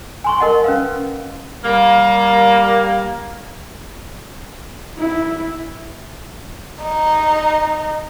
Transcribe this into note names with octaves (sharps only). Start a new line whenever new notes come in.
G#5 C6 C#6
A#4 D#5 F#5 A5 C6
C#4 B4 F5
G3 A#3
E4
D#4